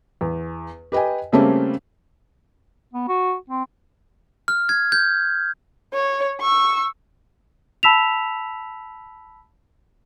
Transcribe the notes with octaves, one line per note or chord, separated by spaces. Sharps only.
E2
G4 B4 D#5 G5 G#5
C#3 G3 A3 A#3 C4 C#4
B3
F#4
C4
F6
G#6
G6
C#5
C#6 E6
A5 B5 E6 B6 E7 F7